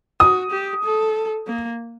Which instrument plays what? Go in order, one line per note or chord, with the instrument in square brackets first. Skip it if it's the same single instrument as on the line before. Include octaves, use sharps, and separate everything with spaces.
[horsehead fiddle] F#4 [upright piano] D#6
[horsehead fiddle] G4
A4
A#3